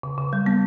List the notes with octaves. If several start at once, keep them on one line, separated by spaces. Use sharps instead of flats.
C#3
C#3
G3
B3